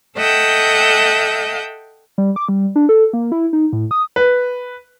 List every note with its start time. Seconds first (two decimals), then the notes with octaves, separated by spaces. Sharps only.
0.16 A4 D#5 E5 F#5 G5 G6
2.18 G3
2.36 D6
2.49 G3
2.76 D4
2.89 A4
3.13 A#3
3.32 E4
3.53 D#4
3.73 A2
3.91 D#6
4.16 B4